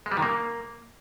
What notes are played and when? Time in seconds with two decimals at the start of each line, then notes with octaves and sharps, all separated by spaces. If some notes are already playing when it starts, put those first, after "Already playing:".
0.06 G#3
0.12 G3
0.17 D#3
0.22 A#3